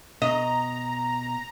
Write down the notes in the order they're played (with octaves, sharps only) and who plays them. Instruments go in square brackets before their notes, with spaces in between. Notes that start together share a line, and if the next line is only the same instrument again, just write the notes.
[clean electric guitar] B2 [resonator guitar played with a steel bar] D#5 [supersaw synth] A#5